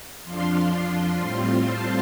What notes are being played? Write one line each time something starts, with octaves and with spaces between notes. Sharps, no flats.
F2 F3 D4 F4 C6
A2 G3 C4 F4
A5